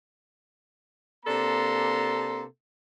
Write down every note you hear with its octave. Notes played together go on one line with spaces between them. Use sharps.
C3 A#3 D4 A4 A#5 C6